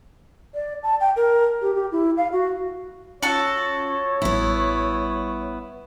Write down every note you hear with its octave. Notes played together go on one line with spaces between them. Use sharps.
D5
A5
G5
A#4
G4
G4
E4
F5
F#4
C#4 F4 F#4 A4 C#5
A1 G3 B3 E4